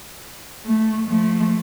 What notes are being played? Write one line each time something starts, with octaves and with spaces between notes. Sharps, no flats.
A3
F3 A3